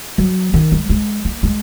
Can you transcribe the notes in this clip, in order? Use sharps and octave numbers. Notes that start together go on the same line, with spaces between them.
F#3
D#3
G#3
G#3
A#3
G#3